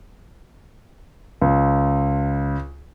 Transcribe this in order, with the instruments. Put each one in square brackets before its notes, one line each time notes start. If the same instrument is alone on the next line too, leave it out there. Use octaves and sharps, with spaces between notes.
[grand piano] C#2